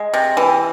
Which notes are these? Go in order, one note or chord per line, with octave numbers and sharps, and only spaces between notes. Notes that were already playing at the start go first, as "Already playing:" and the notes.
Already playing: G#3
C3
E3